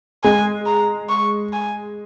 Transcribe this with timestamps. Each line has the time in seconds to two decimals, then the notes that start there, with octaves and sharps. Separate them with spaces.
0.24 G#3 G#5
0.66 A#5
1.09 C#6
1.53 G#5